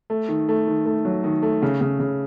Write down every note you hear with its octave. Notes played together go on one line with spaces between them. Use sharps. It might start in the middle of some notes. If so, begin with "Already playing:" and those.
A3
D#3
A3
D#3
A3
F#3
D#3
A3
C#3
C#3
C#3